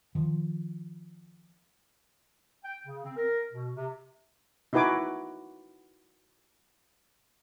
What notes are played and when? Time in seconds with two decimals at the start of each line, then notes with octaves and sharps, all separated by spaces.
0.15 D#3 F3
2.64 G5
2.84 C#3
3.04 C4
3.16 A#4
3.51 B2
3.74 C3
4.73 D#4 E4 F#4 B4 G#5 D6